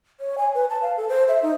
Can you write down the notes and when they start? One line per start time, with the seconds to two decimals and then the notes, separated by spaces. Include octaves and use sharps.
0.20 C#5
0.38 G#5
0.55 B4
0.70 A5
0.82 F5
0.97 A4
1.09 C5
1.28 E5
1.42 D#4